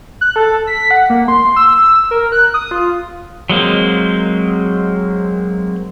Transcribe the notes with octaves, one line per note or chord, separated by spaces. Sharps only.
F#6
A4
B6
F#5
A#3
C6
E6
A#4
F#6
D#6
F4
F#3 G#3 A#3 C4